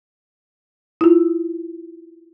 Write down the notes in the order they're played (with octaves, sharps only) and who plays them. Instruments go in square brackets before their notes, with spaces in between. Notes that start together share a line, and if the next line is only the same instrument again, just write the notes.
[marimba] E4 F4